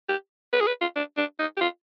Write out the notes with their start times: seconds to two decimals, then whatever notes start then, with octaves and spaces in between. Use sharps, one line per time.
0.09 G4
0.53 B4
0.61 G#4
0.67 B4
0.81 F4
0.96 D4
1.17 D4
1.39 D#4
1.57 G4
1.61 F4